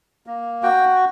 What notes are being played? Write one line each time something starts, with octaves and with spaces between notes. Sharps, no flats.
A#3
F#4 G5